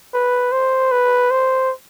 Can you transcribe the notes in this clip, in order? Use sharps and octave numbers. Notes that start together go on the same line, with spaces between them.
B4
C5
B4
C5